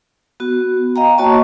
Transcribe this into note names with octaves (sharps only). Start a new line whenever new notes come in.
B3 F#4
D#5 F5 G5 A#5
A#3 F#4 C#5 D#5 A5 C#6